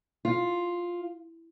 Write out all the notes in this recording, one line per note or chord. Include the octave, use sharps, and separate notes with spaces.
F4